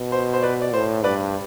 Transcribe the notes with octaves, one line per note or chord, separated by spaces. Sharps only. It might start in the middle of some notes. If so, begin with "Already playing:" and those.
Already playing: B2
C5
C5
B4 D5
D5
A2 C5
G2 B4 D5